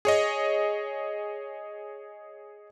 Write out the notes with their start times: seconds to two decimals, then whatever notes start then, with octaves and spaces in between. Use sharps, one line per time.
0.05 G#4 C#5 D#5